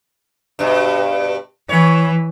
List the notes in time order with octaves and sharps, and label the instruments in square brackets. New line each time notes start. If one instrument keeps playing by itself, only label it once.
[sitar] G2 B2
[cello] E3 [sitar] C#5